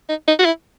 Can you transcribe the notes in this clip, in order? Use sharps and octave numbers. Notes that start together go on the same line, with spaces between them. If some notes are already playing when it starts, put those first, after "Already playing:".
D#4
D#4
F#4
E4